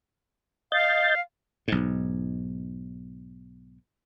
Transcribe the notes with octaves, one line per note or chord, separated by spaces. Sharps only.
D#5 F5 G6 A6
B1 G#2